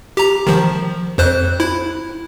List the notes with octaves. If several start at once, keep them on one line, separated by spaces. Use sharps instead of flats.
G4 A#5
D#3 F3
F2 C5 F#6
E4